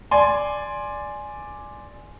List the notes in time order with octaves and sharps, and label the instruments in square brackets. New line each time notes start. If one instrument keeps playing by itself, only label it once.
[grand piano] D5 G#5 C6